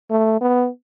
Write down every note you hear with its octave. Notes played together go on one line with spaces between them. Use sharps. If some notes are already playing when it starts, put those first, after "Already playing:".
A3
B3